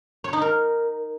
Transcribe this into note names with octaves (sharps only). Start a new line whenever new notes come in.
C#5
D#4
A#4